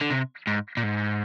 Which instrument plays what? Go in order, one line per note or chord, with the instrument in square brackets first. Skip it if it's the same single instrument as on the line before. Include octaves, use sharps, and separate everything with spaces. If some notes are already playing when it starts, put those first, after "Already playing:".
[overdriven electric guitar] D3
C3
G#2
A#2
G#2